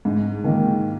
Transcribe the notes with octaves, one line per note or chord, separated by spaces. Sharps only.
G#2
D#3 A#3